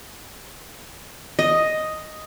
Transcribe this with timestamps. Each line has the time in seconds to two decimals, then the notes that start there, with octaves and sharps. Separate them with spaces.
1.39 D#5